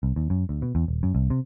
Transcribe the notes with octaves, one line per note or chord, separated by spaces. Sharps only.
C2
D#2
F#2
D2
B2
E2
D#1
F#2
C2
C3